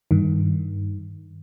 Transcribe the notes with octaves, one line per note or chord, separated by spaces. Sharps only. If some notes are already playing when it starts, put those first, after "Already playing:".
G2 D#3